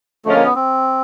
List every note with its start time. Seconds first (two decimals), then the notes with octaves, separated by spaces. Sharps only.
0.25 D3 F3 G#3 A3 C#4 F4
0.35 A#3
0.45 B3
0.55 C4